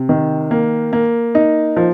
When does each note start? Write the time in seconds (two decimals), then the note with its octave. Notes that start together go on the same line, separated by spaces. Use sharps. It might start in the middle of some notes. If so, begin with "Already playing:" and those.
Already playing: C3
0.09 D#3
0.51 A#3
0.93 A#3
1.35 D#4
1.77 F3